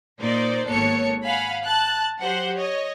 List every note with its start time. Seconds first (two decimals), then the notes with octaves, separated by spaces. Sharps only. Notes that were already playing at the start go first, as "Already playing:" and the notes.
0.18 A#2 D#4 C5 D5
0.66 G#1 A#3 B3 A4 C#5 C#7
1.24 F5 F#5 G#5 B5
1.63 A5 F#6
2.20 F#3 G4 C5 F#5
2.59 C#5 D#5